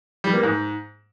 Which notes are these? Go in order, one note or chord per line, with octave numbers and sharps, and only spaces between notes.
G3
A#3
G#2